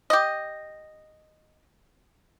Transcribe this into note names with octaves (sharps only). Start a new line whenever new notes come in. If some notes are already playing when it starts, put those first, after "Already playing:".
G4 D#5